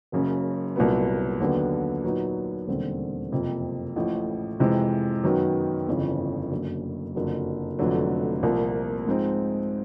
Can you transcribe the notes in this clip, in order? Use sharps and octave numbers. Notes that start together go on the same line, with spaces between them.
F#1 F#2 C#3
C2 A#2 F#3 B3
D#2 D3 F#3 B3
A#2 F#3 B3 D#4
E1 D#2 D3 G3 C4
F#1 F2 C3
A1 A2 F3
F2 C3 E3 G#3
F#2 D#3 F#3 B3
G1 F2 C#3 E3
F#1 F#2 D3
F#1 F2 D3 F#3
F1 F2 D3 F#3
C2 A#2 F3 A#3
G#2 F3 G#3 C4 D#4